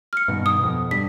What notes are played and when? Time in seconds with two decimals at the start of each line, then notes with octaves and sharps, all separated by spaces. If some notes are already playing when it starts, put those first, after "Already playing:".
0.13 F6 C#7
0.28 G2 B2 D#3
0.46 D#6
0.59 F2 B2
0.91 G2 B6